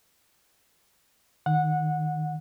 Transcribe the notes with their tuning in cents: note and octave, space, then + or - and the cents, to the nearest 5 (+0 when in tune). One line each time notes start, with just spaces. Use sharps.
D#3 -5 F#5 -20